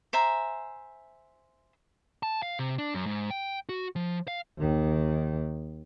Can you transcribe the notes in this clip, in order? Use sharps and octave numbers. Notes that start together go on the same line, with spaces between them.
C5 E5 G#5 A#5
A5
F5
C3
D4
F#2
G#2
G5
F#4
F3
F5
D#2 D#3